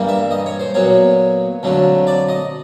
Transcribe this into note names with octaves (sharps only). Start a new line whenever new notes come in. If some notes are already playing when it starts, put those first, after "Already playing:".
Already playing: G2 E3 G3 A#3
E5
D#5
C#5
C5
A#2 F#3 B3 C#5
F2 D3 F#3 A3
D5
D#5